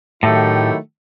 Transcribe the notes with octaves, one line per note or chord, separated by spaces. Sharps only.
A2 D#3 F#3 A3 E4 G4